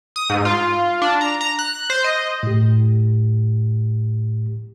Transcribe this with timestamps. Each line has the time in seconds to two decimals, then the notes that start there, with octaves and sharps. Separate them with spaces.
0.16 D#6
0.30 G#2
0.45 F4
1.02 D4
1.21 A#5
1.41 A#5
1.59 F#6
1.90 C5
2.04 D#5
2.43 A2 G4